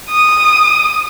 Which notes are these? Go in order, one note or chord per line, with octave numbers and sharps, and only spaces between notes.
D#6